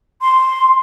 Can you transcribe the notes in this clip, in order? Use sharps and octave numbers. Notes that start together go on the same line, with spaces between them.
C6